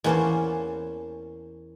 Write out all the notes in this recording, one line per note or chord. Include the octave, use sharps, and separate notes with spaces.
E2 A#3 C#4 C5 C#5 A5